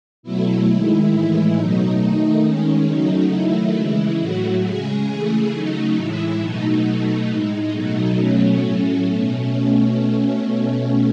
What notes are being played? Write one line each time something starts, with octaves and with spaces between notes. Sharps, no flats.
B2 F#3 A3 E4
D#3 G#3
A2 E3 G#3 E4
B2 F#3 A3 D#4
D#3 A3 D#4
D#3 G#3 C#4
C#3 F#3 A3 D#4
D#3 F#3 A3 E4
C#3 E3 G#3 E4
A2 F#3 A3 F#4
C#3 G#3 G#4
C#3 E3 A3 G#4
C#3 F#3 A3 D#4
A2 E3 G#3 E4
B2 F#3 A3 D#4
B2 F#3 A3
A2 G#3 D#4
B2 F#3 A3
B2 F#3 A3 C#4
A2 F#3 A3
B2 A3